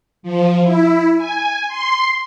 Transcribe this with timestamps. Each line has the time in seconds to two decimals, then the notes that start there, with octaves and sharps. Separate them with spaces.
0.23 F3
0.63 E4
1.18 G#5
1.68 C6